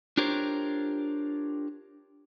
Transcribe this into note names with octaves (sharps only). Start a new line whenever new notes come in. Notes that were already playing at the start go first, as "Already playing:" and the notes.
D4 F4 G4 A#4 C5 C#5